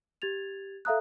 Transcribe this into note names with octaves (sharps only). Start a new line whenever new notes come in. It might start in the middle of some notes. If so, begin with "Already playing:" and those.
G4 G#6 A6 F7
A4 E5 F5 A#5 D#6 F#6